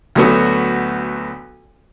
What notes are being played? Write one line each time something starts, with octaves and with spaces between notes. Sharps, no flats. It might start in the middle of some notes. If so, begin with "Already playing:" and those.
D2 F#3 A3 B3 F#4